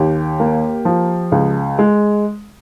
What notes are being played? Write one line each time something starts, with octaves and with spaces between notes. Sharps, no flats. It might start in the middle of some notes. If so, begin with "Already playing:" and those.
Already playing: D#2 G4
A#3
F3
C#2
G#3